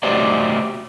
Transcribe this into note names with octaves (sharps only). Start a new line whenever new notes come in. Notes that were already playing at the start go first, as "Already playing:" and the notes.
A3 F#4 G4 C5 D5 D#5